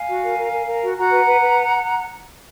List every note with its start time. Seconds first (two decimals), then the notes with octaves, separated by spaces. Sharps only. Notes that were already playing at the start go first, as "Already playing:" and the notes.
Already playing: F5 G#5
0.09 F#4
0.24 A#4
0.38 A#4
0.52 A#4
0.67 A#4
0.81 F#4
0.97 F#4 F#5 A#5
1.12 B4
1.26 B4
1.41 B4